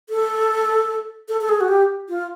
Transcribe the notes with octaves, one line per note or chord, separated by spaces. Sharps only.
A4
A4
A4
G#4
F#4
G4
F4